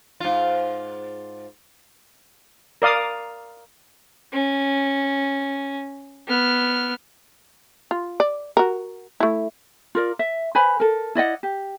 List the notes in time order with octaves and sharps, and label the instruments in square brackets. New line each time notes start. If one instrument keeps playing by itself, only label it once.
[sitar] G#2 F4
[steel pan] A#4 D5 F5 D#6
[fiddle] C#4
B3 F6
[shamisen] F4
D5
F#4 A#4
A3 E4
[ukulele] F4 A#4 D5
E5
B4 C5 G#5 B5
A4 A#4
E4 D5 D#5 F#5
G4